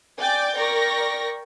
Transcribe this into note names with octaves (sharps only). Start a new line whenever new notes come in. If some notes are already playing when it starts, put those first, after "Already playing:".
D5 G5 G#5 D6 G6 A6
A#4 D5 G5 C#6 A#6